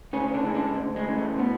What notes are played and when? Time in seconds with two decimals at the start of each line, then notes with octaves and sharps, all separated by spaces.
0.13 D2 C#3 C#4
0.28 C#4
0.34 D3 D4
0.44 C#3 E3 G#3
0.54 D3 D4
0.76 D2
0.96 G#3
1.08 C#3 E3 G#3
1.18 A3
1.38 B2 B3